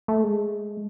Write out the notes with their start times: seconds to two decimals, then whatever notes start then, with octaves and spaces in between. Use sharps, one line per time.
0.08 A3
0.23 G#3